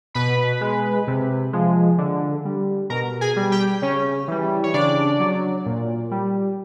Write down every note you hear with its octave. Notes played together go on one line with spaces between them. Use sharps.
B2 B4 B5
G#3
C3
F3 G#3
D3
G3
B2 A#4 A#5
G#4 G#5
G3
G4 G5
C#3 C#4 C#5
E3 G3
C#5
C#3 D4 D5
F#3
A#2
G3